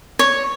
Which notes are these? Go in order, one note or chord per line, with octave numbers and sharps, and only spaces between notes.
C#5